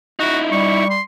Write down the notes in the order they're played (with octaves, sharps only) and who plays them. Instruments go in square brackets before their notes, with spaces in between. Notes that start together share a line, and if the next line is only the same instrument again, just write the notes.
[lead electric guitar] D#4 E4 [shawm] F#4
[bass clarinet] G3 [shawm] C#6
[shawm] C6